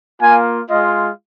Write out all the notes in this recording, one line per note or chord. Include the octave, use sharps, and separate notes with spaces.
A#3 F4 G#5
G#3 F4 D#5